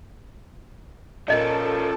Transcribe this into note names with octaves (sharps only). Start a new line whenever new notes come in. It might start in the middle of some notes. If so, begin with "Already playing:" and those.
A#2 F3 C#4 A4 A#4 D5 D#5